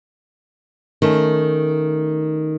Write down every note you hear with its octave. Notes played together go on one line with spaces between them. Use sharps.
D#3 A3 C#4